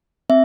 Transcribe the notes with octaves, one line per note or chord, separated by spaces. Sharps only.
C4 E5